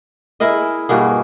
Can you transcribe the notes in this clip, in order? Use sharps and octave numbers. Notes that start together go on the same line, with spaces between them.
E4 G#4 A#4 D#5
G2 B2 A#3 G#4